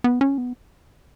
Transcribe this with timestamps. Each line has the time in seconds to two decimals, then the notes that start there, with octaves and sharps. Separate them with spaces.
0.04 B3
0.21 C#4
0.38 B3